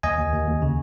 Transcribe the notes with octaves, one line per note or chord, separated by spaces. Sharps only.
D#2 D#5 G#5
D#2
D#2
D#2
C#3